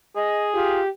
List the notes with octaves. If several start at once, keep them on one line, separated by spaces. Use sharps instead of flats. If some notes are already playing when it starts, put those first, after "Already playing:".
G#4 D#5
F4 G4